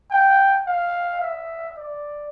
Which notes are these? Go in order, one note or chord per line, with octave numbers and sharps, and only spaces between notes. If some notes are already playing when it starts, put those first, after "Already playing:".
G5
F5
E5
D5